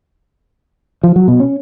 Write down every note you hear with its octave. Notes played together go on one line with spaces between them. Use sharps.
F3
F#3
B2
C#4